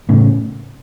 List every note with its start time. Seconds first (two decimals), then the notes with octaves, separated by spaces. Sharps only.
0.09 A2 C#3